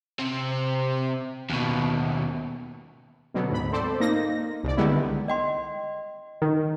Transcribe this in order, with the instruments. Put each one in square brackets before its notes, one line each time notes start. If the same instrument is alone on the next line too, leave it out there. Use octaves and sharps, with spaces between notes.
[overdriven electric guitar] C3 C4
D#2 B2
[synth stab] B2 D3 F#3 B3
D2 G#2 B5
C4 A4 C5 D5
A#3 D#4 A#6
C2 D5
D3 D#3 G3 G#3 B3 E4
[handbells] D#5 G5 C6
[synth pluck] D#3